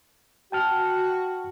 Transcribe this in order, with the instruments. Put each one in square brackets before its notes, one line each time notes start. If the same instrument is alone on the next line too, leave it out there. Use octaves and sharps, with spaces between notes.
[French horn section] F#4 [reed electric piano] G5 A5 F6